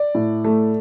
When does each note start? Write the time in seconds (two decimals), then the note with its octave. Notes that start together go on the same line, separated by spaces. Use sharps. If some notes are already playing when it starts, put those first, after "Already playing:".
Already playing: D5
0.15 A2
0.45 A3